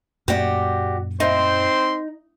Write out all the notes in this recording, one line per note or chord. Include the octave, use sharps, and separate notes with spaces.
F#2 A#2 A#3 F#4 G4 D5
C4 D#4 C5 C6